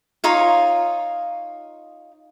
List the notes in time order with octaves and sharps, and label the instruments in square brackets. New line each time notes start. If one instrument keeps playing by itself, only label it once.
[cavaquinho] D#4 F4 C#5 F5